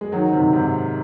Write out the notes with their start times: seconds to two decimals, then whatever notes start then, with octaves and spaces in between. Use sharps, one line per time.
0.01 G#3
0.12 D#3 F#3
0.32 C3 D#3
0.53 G#2 C3